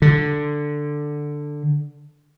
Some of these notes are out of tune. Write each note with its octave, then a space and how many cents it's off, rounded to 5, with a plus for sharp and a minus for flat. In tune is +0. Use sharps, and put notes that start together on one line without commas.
D3 +5